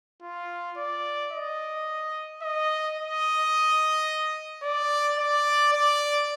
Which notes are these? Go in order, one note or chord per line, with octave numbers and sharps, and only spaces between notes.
F4
D5
D#5
D#5
D#5
D5
D5
D5